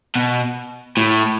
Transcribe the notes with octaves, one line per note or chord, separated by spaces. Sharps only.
B2
A2